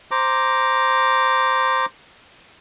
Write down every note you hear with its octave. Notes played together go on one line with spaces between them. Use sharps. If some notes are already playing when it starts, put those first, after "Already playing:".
C5 A#5 D6